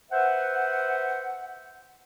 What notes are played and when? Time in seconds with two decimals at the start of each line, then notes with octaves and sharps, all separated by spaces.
0.11 B4 C5 E5 F#5